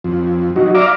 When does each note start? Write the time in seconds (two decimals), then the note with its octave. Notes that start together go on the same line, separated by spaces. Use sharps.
0.04 F2
0.56 F#3 D#4 F#4
0.75 D5 E5 F5 A#5 D6